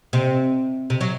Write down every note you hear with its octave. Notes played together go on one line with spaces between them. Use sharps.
C3
C3
F#3